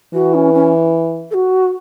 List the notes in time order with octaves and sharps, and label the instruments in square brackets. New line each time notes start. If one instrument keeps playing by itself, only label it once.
[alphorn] E3 [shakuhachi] F#4
[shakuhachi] C#4
C#4
A4
F#4